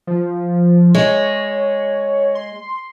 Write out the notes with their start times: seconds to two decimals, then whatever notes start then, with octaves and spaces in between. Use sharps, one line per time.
0.07 F3
0.95 G#3 C#5
2.35 C6